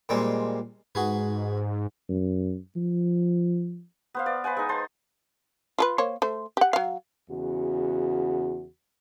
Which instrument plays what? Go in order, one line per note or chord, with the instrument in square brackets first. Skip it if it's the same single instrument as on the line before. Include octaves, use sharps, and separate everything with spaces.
[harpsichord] A#2 G3 G#3 C4
[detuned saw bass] G#2 [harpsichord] F#4 G#4 B4
[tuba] F#2
F3
[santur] B3 C5 F5
D5
B4 C5 F#5 G#5
G#3 D#4
C5 A5 C6
[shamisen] F4 A4 B4
A#3 C5 C#5
A3 C5
G4 F#5
F#3 F5
[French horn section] E2 C#3 F#4